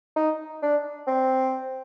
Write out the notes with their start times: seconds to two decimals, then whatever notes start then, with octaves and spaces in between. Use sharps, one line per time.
0.16 D#4
0.63 D4
1.07 C4